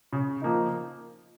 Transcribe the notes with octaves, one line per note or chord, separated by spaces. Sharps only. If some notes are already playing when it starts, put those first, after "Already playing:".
C#3
F3 A#3 D#4